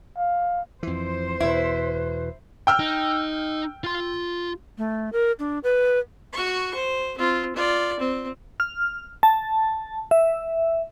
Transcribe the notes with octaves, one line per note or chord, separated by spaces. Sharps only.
F5
F2 E3 C5
E2 B2 E4 B4
G5 E6 F6
D#4
F4 C6
A3
A#4
D4
B4
F#4 C#6
C5
C4 F4
F4 D5
C4
F6
A5
E5